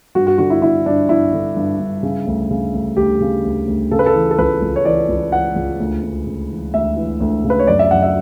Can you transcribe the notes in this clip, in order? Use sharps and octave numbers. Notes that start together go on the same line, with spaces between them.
G2 F#4
F#4
D3 F#4
E4
D3 E4
G2 D4
G2 E4
D3
G2
G2
C#3
D2
C#3
D2
D2 G4
C#3
D2
D2
C#3 A4
B4
A4
E3
A4
C#2 B4
C#2
C#5
E3 D5
C#2
E3 F#5
C#2
D2
D2
C#3
E3
D2 E5
E3
D2
C#3
B4
C#5
F#2 D5
E5
F#2 F#5
E5